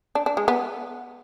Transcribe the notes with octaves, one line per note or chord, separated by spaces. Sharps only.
D4
D4
G#3
B3